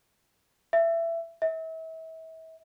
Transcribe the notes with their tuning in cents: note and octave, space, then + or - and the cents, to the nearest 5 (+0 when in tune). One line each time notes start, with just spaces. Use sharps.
E5 +20
E5 -35